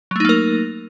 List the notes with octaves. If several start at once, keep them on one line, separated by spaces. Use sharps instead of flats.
F#3 A3 A#3 D#4 A#4